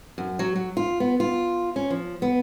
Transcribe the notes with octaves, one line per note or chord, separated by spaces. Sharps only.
F#2
F#3
F#3
F4
B3
F4
C#4
F3
B3